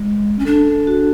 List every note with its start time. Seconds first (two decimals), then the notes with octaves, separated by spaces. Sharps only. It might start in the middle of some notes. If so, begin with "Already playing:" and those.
Already playing: G#3
0.39 C#4
0.45 D4 A4
0.87 F#4